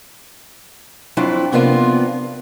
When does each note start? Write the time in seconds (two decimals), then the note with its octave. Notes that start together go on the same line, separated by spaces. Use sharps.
1.17 F2 F#3 D4 E4 F4 G5
1.52 C3 F3 A#3 B3 D4 F4